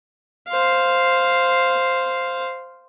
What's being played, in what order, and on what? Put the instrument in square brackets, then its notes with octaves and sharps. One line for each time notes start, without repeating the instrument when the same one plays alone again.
[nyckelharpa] C5 F5